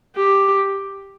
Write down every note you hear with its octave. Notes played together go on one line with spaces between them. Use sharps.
G4